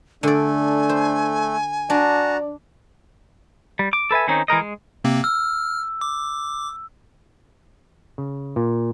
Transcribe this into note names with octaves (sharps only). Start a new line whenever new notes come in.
D3 A3 D4 D5 G#5
C5
D4 F#4 D5 A5 A#5
G3
D6
A4 B4 E5 G#5
D#3 C4 C#4 D#4
E3 G#3 A#4 D#5
G#3
C3 A#3 C4
E6 F6
D6
C#3
A#2